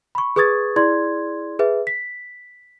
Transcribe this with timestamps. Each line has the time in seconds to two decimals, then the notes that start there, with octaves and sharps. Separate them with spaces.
0.15 B5 C#6
0.36 G#4 B4 C#6 D#6 G#6 A6
0.76 E4 G#4 D5 C6 G#6
1.59 G#4 B4 E5
1.87 B6